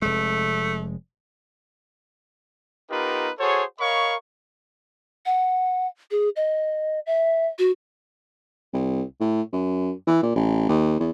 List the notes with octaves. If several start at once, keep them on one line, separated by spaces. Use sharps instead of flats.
F1 G#3 A3
B3 D#4 F4 G4 A#4 B4
F#4 G#4 A4 C5 C#5
A#4 C#5 D#5 F5 B5 C#6
F#5
G#4
D#5
E5
F#4
C2
A2
F#2
E3
A#2
A1
D#2
E2